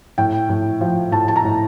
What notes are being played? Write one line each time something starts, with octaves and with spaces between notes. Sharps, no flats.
A2 G5
A2
F3
A2 A5
A5
A#5
A2